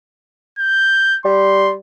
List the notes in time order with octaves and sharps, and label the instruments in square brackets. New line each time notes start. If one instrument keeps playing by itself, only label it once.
[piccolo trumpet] G6
[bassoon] G3 [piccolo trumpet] C6